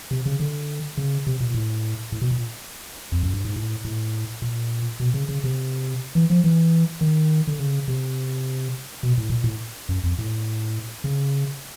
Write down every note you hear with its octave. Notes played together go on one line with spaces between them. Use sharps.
C3
C#3
D3
C#3
C3
A#2
A2
A2
B2
A#2
F2
F#2
G2
G#2
A2
A2
A#2
B2
C#3
C#3
C3
E3
F3
E3
D#3
D3
C#3
C3
B2
A2
A#2
A2
F#2
F2
A2
C#3